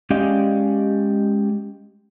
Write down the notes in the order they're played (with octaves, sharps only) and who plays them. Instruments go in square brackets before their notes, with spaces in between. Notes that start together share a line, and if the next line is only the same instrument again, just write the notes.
[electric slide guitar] G#3 C#4 G4 D5 D#5 F5